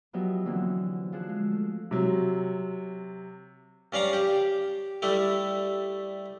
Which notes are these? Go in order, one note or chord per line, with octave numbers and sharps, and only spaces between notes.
F3 F#3 B3 G4 D#5 E5
D3 E3 F#3 A#3 C4
F3 F4 G#4 E6 F#6
G#3
A3
C3 F#3
G2 C#4 D5 F5 A#5
G4
G3 A3 E4